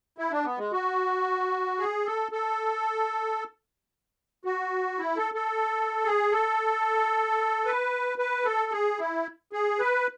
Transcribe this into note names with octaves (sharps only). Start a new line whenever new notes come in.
E4
D4
B3
G#3
F#4
G#4
A4
A4
F#4
E4
A4
A4
G#4
A4
B4
B4
A4
G#4
E4
G#4
B4